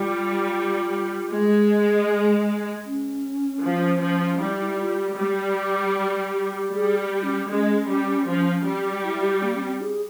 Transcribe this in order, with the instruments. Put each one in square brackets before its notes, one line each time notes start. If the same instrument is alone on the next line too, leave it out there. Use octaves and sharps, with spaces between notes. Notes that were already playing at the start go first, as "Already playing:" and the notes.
Already playing: [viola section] G3 [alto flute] F4
[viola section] G#3
[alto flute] C#4
[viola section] F3
F3
[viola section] G3 [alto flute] E4
[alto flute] E4
F4
G4
[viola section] G3
[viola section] G3 [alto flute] G#4
[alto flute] G4
C#4
[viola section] G#3 [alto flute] C#4
[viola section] G3
F3
G3
[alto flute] E4
G4
A#3
C#4
C4
G#4